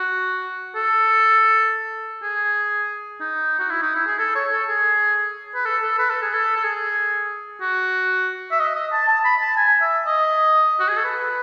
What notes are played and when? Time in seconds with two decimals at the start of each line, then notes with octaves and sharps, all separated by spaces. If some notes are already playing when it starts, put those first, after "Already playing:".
Already playing: F#4
0.76 A4
2.23 G#4
3.21 D#4
3.59 F#4
3.70 E4
3.82 D#4
3.95 E4
4.07 G#4
4.19 A4
4.35 C#5
4.52 A4
4.68 G#4
5.55 B4
5.66 A4
5.82 A4
5.98 B4
6.10 A4
6.22 G#4
6.33 A4
6.56 A4
6.63 G#4
7.61 F#4
8.51 E5
8.60 D#5
8.76 D#5
8.92 A5
9.08 A5
9.25 B5
9.41 A5
9.57 G#5
9.81 E5
10.07 D#5
10.80 F#4
10.89 G#4
10.97 A4
11.04 B4